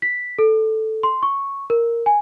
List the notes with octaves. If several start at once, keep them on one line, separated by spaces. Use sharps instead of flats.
B6
A4
C6
C#6
A#4
G#5